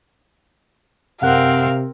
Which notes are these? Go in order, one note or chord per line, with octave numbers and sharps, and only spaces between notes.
F#2 C3 C4 A#4 F5 F#5 F#6